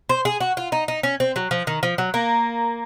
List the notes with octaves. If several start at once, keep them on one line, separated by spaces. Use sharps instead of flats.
C5
G#4
F#4
F4
D#4
D#4
C#4
C4
F#3
F3
D#3
F3
F#3
A#3